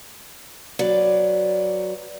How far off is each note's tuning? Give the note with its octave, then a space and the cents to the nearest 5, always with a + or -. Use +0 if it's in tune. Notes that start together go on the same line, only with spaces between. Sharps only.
F#3 +0 B4 +0 D5 +0